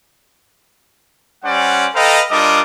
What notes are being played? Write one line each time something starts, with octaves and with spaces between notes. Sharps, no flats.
G3 C#4 C5 D5 F#5
A4 B4 D#5 F5 G5 A#5
G3 D4 F4 A#4 D#5 D6